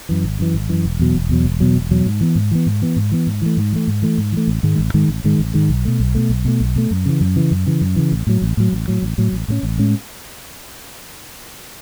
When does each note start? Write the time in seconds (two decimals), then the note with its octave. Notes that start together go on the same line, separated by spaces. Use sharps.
0.09 F#2 E3
0.24 G#1
0.39 F#2 E3
0.54 G#1
0.69 F#2 E3
0.85 E1
0.99 E2 B2 F#3
1.15 E1
1.30 E2 B2 F#3
1.44 E1
1.60 E2 B2 F#3
1.75 E1
1.91 E2 B2 F#3
2.06 G#2
2.21 E3 B3
2.35 G#2
2.51 E3 B3
2.66 G#2
2.82 E3 B3
2.96 G#2
3.12 E3 B3
3.27 G#2
3.42 E3 A3
3.57 G#2
3.72 E3 A3
3.87 G#2
4.02 E3 A3
4.18 G#2
4.32 E3 A3
4.47 A1
4.63 G#2 D#3 G#3
4.79 A1
4.94 G#2 D#3 G#3
5.09 A1
5.24 G#2 D#3 G#3
5.39 A1
5.54 G#2 D#3 G#3
5.69 B1
5.85 B2 A3
6.00 B1
6.15 B2 A3
6.30 B1
6.45 B2 A3
6.60 B1
6.76 B2 A3
6.91 F#2
7.06 C#3 E3
7.21 F#2
7.36 C#3 E3
7.51 F#2
7.66 C#3 E3
7.81 F#2
7.96 C#3 E3
8.12 A1
8.27 A2 F#3
8.42 A1
8.57 A2 F#3
8.73 A1
8.88 A2 F#3
9.02 A1
9.18 A2 F#3
9.33 A1
9.48 A2 G#3 C#4
9.63 A1
9.78 A2 G#3 C#4